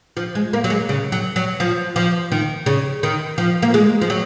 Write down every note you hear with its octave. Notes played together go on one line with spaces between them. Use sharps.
F3
G#3
A#3
F#3
G#3
C#3
F#3
F#3
F3
F3
D#3
C#3
D#3
F3
A#3
G#3
F3
F#3